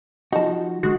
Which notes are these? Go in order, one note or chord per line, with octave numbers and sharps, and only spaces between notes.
F3 D#4 F#4 A5
D3 G#3 F#4